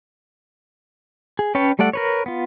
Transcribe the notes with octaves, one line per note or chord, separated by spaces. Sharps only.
G#4
C#4 B4 C#5 G5 A5
G3 A3 A4 D5 F#5
A#4 B4 C#5
B3 F4